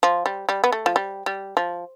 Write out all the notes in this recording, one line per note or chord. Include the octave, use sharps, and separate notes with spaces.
F3
G3
G3
B3
A3
F3
G3
G3
F3